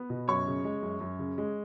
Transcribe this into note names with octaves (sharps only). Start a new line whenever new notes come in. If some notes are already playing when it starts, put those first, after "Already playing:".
Already playing: B3
B2
F#2 C#5 C#6
C#3
G#3
F#2
F#2
C#3
G#3